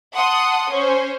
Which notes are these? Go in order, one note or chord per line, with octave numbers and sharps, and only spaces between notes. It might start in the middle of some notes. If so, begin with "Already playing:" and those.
F#5 A5 C6 D#6
C#4 C5